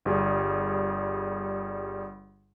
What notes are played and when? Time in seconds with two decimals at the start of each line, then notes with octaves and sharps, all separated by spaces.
0.05 G1 G3 G#4